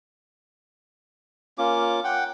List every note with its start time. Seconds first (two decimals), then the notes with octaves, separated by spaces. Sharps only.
1.58 A#3 C#4 F4 D6
2.04 F#5 G5